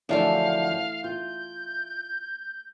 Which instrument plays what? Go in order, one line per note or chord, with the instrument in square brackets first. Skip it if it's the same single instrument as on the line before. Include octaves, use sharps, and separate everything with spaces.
[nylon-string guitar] F#2 D3 F3 [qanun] E3 A3 E5 [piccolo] F5
[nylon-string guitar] F4 [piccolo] G6